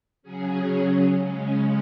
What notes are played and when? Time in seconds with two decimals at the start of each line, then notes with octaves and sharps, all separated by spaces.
0.22 C#3 F#3 C#4 G#4
1.22 C#3 G#3 C#4